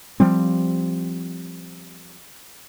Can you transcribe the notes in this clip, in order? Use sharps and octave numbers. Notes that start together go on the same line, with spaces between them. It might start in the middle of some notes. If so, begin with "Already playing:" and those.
F3 G3 C4